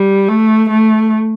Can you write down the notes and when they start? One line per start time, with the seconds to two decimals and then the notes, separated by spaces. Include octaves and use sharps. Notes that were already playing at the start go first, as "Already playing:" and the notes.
Already playing: G3
0.28 A3
0.70 A3